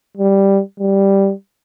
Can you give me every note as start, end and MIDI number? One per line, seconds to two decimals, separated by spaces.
0.17 0.61 55
0.80 1.32 55